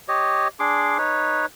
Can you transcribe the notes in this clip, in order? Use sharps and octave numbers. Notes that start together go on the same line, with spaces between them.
G4 C#5 D#5
D4 G#4 C6 D6
D#4 B4 C#5